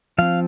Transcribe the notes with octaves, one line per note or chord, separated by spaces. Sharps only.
F3 C4 F5